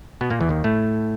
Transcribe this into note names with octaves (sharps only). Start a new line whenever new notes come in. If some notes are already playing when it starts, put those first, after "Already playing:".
B2 B3
A#2 A#3
E2 E3
D#2 D#3
A2 A3